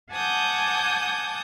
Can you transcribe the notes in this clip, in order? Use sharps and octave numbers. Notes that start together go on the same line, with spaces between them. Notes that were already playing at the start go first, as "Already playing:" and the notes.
F#5 G#5 A5 D6 D#6 G6